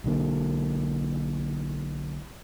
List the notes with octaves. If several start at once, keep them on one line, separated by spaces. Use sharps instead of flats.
B1 D3 A#3